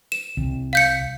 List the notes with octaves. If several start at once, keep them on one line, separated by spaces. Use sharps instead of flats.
E7
C2
F5 G6 C#7